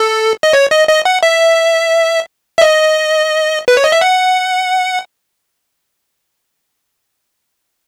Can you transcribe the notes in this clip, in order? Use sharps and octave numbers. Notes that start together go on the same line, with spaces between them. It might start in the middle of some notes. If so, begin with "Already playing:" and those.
Already playing: A4
D#5
C#5
D#5
D#5
F#5
E5
E5
D#5
B4
C#5
D#5
E5
F#5